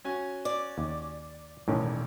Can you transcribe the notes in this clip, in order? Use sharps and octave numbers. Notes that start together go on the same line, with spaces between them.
C#4 F#4 G#5
D5
D#2
E1 B1 A2 D#3 C#4